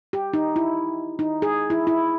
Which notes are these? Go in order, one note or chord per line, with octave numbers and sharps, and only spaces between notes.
G4
D#4
E4
D#4
G#4
E4
E4